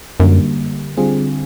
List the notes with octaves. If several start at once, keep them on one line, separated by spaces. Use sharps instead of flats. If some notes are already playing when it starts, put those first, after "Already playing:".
F#2 D3 G3 A#3
D3 G3 C4 F4 G#4